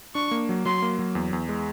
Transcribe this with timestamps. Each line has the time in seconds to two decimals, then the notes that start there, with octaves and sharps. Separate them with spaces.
0.15 D4 C#6
0.31 A#3
0.49 F#3
0.66 F#3 C6
0.82 A#3
0.99 F#3
1.15 E2
1.33 E2
1.49 G#3